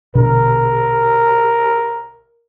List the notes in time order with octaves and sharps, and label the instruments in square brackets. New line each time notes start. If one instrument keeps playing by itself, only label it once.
[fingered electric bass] A#1 B2 D3 [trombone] A#4